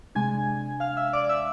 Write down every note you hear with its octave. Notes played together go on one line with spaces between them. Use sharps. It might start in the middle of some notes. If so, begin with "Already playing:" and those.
C3 G#3 D4 G#5 G#6
F5 F6
E5 E6
D5 D6
E5 E6